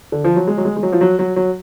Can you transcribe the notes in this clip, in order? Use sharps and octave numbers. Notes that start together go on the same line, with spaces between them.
D3
F3
F#3
G#3
F#3
G#3
G#3
F#3
F3
F#3
F#3
F#3